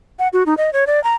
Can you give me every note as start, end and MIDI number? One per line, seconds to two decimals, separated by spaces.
0.19 0.28 78
0.33 0.43 66
0.46 0.57 63
0.57 0.73 75
0.73 0.85 73
0.87 1.02 74
1.04 1.15 82